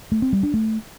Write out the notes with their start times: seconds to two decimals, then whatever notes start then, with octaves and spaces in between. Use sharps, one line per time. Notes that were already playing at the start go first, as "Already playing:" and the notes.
0.12 A3
0.22 C4
0.33 G3
0.43 D4
0.54 A3